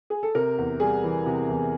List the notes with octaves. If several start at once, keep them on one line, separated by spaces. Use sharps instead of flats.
G#4
A4
C3 A#4
E2
G3 G#4
E3
C3
E2